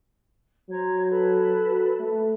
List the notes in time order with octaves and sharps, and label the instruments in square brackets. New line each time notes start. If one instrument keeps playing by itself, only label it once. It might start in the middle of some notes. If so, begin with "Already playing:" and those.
[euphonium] F#3 [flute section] C5 A#5 G#6
[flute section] A4 B4 B5
[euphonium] F#4
A3